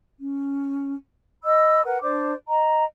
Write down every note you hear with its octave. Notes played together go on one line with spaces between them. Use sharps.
C#4
D#5 B5 E6
A#4 B4 F#5
D4 C5 D5 D6
D#5 A#5